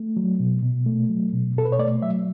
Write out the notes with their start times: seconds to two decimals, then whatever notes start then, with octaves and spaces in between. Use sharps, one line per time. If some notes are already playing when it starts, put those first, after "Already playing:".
Already playing: A3
0.17 F#3
0.40 B2
0.62 B2
0.86 A3
1.09 F#3
1.33 B2
1.56 B2 A4
1.65 B4
1.72 C#5
1.79 A3 D5
2.02 F#3 E5